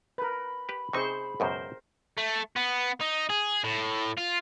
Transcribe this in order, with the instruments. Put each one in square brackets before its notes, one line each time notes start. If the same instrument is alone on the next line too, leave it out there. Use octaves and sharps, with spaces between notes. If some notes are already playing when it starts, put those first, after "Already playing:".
[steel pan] A#4 B4 [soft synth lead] B5
[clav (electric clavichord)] G4 B4
[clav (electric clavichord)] C3 D#4 [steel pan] G#4 C5 C#6
[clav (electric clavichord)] C#2 F#2 B2 [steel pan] A#4 C5
[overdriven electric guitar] A3
B3
D#4
G#4
A2
F4